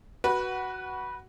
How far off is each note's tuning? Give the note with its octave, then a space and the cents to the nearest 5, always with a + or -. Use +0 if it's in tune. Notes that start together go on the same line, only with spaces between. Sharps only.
F#4 +10 B4 -15